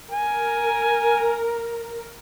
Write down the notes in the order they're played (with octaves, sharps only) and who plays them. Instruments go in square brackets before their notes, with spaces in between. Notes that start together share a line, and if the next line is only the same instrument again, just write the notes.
[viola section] A#4 [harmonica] G#5